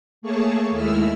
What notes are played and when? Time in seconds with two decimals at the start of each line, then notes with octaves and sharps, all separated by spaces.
0.22 A3 A#3 G#4 C#5 A5 C#6
0.70 D#2 G#3 A3 E4 E6 F6